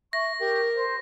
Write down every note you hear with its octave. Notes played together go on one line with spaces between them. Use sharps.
E5 C#6 A#6
G4 A#4
C5